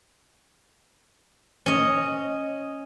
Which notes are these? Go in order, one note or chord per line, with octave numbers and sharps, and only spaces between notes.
C#4 D#5